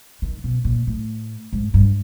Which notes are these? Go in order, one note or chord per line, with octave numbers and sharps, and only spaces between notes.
D#3
B2
A#2
A2
G#2
G2